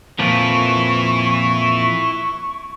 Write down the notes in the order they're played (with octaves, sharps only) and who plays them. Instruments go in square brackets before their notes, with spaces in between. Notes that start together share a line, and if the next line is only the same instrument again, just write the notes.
[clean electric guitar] F2 A#2 F3 [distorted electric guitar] E4 B4 [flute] C#6